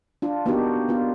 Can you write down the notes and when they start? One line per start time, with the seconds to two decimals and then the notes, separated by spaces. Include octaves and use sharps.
0.22 D4 F4
0.46 A#3 B3 D4 D#4 F#4 G4
0.89 B3 F4